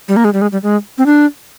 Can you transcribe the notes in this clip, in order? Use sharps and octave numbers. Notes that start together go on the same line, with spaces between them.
G3
A#3
G#3
G3
G#3
G3
G#3
C4
D4